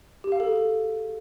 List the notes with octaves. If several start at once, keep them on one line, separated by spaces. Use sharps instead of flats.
G4
F5
A4
G#4
A4